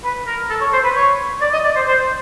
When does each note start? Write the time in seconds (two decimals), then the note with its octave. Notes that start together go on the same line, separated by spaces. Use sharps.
0.04 B4
0.27 A#4
0.50 A4
0.61 C#5
0.73 C5
0.84 B4
0.95 C#5
1.41 D5
1.53 D#5
1.64 D5
1.76 C5
1.87 C5